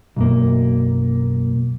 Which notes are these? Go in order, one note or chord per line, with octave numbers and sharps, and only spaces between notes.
B1 F#2 A#3